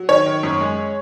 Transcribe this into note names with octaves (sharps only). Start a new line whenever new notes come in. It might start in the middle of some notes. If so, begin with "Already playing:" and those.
Already playing: F#3
D#3 C#5
D#3
F#2
G#3